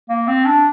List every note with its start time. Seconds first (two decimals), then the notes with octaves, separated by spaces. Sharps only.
0.09 A#3
0.27 C4
0.45 D4